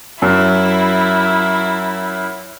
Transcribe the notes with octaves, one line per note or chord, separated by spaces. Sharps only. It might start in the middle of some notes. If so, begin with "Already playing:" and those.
F#2 E4